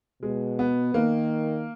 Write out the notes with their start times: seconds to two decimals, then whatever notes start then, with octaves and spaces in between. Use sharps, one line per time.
0.23 B2 G#3
0.59 B3
0.94 D#3 A#3